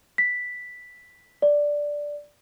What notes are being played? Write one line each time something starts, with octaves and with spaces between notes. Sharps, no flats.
B6
D5